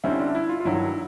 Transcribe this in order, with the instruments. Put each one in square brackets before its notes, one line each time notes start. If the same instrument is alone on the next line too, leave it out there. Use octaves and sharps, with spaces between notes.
[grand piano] D3 G3 C4 E4 [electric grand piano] C#4
[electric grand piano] D4
E4
F4
F4
[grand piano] G2 D#3 F#3 [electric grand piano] E4